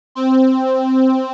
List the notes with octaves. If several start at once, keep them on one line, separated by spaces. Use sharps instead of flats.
C4